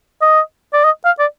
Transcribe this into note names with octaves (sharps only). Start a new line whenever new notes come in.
D#5
D5
D#5
F5
D5